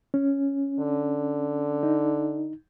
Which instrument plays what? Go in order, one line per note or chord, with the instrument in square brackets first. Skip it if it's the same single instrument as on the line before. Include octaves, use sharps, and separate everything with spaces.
[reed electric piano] C#4
[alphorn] D3
[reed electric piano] D#4